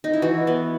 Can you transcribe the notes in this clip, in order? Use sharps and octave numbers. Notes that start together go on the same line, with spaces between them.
D#4
E4
E3 F#4
B3